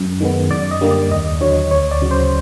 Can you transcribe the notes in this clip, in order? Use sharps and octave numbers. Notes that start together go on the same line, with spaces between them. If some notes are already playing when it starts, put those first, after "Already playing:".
Already playing: F#2
D#3 G#3 B3
F#2 D5
D#5
D3 G3 A#3
D5
D#2 D#5
D3 F#3 C#5
D2 C#5
D5
C#3 F#3
C5